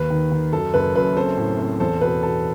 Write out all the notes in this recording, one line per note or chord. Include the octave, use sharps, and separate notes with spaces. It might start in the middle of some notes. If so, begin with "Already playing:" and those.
Already playing: D#2 B4
D#3
D#3
F#2 A4
F#1 B4
F#2 B4
C4 A4 C5
A2
C4
E2 A4 C5
B2 B4
B2 A4